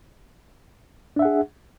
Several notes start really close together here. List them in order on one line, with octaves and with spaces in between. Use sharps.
D4 E5 F#5 G#4